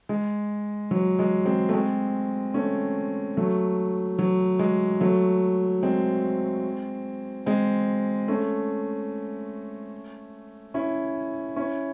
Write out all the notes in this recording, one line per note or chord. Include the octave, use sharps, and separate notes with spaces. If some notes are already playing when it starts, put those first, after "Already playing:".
G#3
F#3
G#3
G#3 C4
A3
G#3 C4
A3 C#4
F#3 A3
F#3
G#3
F#3 A3
G#3 C4
G#3 C4
A3 C#4
C#4 E4
C#4 E4